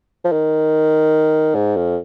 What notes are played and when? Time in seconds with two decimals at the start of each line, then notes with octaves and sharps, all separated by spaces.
0.24 F3
0.32 D#3
1.55 G#2
1.76 F2